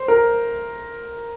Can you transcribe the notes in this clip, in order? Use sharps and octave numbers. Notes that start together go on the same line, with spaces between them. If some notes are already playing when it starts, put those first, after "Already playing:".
Already playing: C5
A#4